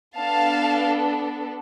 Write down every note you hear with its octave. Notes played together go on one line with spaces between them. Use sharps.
B3 D4 A4 F5 A5